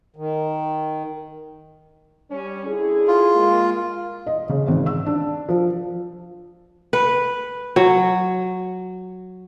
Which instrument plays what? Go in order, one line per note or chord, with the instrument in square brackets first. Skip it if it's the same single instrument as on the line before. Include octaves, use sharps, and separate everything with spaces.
[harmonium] D#3
[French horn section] G3 C#4
D3 E4 G#4
[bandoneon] F4
[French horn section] G#3 A#3
[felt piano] D#5
C#3
G#1
E6
D4
F3
[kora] B4
F#3